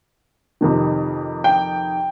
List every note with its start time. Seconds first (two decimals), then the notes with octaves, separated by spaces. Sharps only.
0.61 F2 C3 D#3
1.44 G5